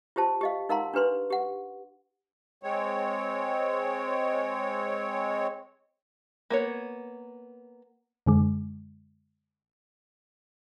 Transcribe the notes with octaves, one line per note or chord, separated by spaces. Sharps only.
F4 G4 C5 A5
G4 D#5 F5
D#4 A#4 F5 F#5 A#5 C6
D4 G4 B4 C6
G4 F#5
G#3 C4 C#5
A#3 B3 C#5
F#2 D3 G#3